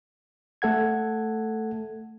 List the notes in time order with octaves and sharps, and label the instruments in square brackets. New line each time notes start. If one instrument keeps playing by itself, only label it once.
[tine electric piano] A3 A4 F#5 G#6